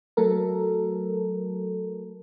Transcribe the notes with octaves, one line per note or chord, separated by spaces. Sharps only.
F#3 A3 A4 A#4